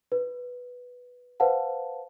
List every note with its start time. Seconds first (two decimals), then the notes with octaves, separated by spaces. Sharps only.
0.12 B4
1.40 B4 C5 F5 F#5 A5